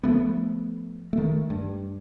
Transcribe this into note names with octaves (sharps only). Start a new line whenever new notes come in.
F3 A3 B3
D#3 A3
G2